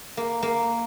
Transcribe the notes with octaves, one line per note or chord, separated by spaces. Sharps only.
A#3
A#3